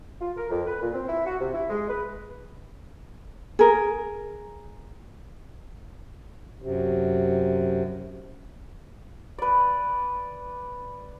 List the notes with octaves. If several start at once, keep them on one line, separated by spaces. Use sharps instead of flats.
F4
A#4
F2
B4
A#2
C4
E4
F#4
C3
E4
G#3
B4
G#4 A#4
F#2 C3
B4 D5